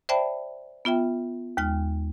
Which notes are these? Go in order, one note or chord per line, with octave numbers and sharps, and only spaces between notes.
C5 D5 E5 G5 A5 B5
B3 F4 E5 G5
D#2 G#3 G5 F6